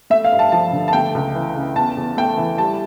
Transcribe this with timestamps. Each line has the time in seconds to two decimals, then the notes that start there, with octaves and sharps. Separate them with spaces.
0.10 A3 E5
0.24 F5
0.32 G2
0.39 A5
0.52 F3 A5
0.72 D3
0.88 A5
0.93 A3 G5
1.15 C#2
1.35 E3
1.56 C#3
1.76 E2 A5
1.97 E2
2.17 A3 G5
2.38 E3
2.58 G3 A5